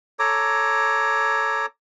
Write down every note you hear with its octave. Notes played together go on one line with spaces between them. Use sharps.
A4 C#5 A#5 D6